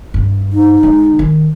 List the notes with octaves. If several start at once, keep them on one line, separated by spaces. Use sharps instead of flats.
G2
D#4
D3 G#3
D#3